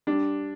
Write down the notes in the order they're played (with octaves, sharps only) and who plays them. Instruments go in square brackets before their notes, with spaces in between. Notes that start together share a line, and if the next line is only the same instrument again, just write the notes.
[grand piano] G3 D4